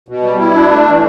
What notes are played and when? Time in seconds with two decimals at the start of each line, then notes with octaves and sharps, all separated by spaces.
0.09 B2
0.24 G3
0.39 E4
0.55 D4
0.71 A3
0.87 E3